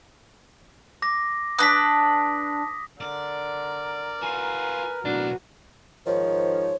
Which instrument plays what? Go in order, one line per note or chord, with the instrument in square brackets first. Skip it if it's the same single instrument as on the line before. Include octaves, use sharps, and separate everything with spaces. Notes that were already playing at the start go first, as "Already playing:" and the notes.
[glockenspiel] D6 A#6
[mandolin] D4 B4 [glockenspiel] D#6 A#6 B6
[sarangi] D3 [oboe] A#4 [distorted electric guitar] D5
[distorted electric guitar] F4 F#4 [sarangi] B4 [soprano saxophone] G#5
[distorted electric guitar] B1 A2 [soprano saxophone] D4 [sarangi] F#4
[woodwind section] G#2 D#3 F3 [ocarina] C#5